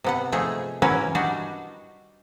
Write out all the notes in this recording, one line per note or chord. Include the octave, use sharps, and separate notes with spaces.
C3 B3 F#5
F3 A3 D#4 G#4
E3 F#3 C#4 A#4 B4
G3 D4 D#4 F#4